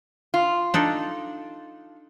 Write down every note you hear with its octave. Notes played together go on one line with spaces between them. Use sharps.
F4
D4 D#4 A4